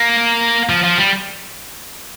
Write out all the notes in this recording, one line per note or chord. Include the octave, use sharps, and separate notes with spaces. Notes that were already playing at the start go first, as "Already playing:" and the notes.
Already playing: A#3
F3
F3
G3